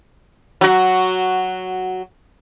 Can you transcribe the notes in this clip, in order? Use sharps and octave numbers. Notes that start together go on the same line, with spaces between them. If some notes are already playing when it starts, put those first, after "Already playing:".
F#3 F#4